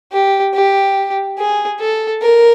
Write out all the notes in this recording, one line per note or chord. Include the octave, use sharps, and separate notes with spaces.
G4
G4
G#4
A4
A#4